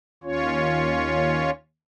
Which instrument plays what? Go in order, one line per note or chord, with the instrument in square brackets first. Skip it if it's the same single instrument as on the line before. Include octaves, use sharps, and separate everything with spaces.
[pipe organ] D#2 C#4 F4 C#5